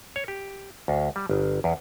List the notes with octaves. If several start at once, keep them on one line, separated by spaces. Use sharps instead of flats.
C#5
G4
D2
G3
G1
E2